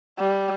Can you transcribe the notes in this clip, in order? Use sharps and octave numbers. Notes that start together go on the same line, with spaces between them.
G3